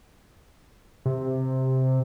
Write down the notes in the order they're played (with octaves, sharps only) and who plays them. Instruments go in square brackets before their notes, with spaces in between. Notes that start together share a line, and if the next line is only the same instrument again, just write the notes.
[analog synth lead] C3